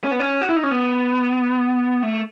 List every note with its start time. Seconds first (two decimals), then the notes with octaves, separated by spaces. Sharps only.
0.04 C#4
0.11 B3
0.20 C#4
0.41 F#4
0.49 E4
0.56 D#4
0.63 C#4
0.71 B3
2.03 A3